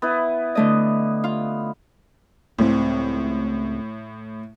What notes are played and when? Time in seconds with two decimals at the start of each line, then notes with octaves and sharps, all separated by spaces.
0.02 B3 E4
0.55 D3 A3 D#5
1.24 F4
2.58 C#2 A2 G3 C4